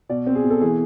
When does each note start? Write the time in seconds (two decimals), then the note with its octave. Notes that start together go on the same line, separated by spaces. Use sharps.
0.09 B2 D5
0.27 C4
0.35 G#4
0.44 B2
0.50 A4
0.61 E3 G#4